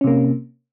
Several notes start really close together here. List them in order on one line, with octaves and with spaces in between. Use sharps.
C#4 C3 A#3